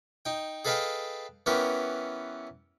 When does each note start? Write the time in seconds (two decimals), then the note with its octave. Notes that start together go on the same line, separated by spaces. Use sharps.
0.25 D#4 G5
0.65 G#4 A4 B4 D#5 F5 G5
1.46 E3 B3 C#4 G4 A#4